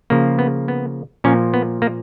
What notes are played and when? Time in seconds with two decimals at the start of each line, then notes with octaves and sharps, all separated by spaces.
0.10 C#3 F3 A#3
0.39 B3
0.68 B3
1.24 A#2 F3 A#3 C#4
1.54 B3
1.82 A#3